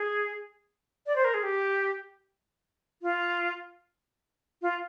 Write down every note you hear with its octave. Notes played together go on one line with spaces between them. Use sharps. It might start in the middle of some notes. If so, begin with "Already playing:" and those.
Already playing: G#4
D5
C5
A#4
G#4
G4
F4
F4